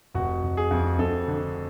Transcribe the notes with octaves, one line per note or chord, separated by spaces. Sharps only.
F1 F#4
F1
G#4
F2
F2 A4
D3